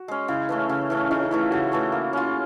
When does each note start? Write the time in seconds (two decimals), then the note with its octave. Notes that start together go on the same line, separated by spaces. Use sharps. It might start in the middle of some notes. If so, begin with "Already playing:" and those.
Already playing: F#4
0.08 G#3 C#4
0.28 C#3 E4
0.49 E3 A3 C#4
0.69 C#3
0.90 E3 A3 C#4
1.10 C#3 D#4
1.20 D#4
1.31 E3 A3 C#4 E4
1.41 F4
1.51 C#3 F#4
1.72 E3 A3 C#4
1.92 A#3
2.13 C#4 F4